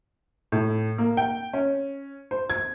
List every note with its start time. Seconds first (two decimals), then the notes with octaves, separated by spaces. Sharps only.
0.52 A2
0.98 A#3
1.17 G5
1.53 C#4
2.31 C5
2.50 G#6